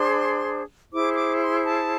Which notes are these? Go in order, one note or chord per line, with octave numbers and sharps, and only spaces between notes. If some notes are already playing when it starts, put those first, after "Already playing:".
Already playing: D4 G#4 C5 C6
E4 G#4 C5 D6
D6
C6
A5